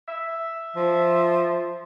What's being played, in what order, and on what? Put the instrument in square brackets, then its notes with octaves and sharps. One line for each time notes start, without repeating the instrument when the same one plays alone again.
[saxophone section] E5
[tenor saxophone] F3